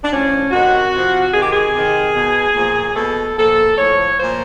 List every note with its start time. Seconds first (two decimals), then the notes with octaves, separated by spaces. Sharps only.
0.03 D4
0.11 A2 F3 C#4
0.51 C3 D#3 F#4
0.93 C3 F3
1.33 C3 D#3 G#4
1.43 G4
1.52 G#4
1.74 C3 D#3
2.15 B2
2.56 A#2 F3
2.96 B2 A4
3.38 A#2 F3 A4
3.78 A2 F3 C#5
4.18 A#2 F3 C5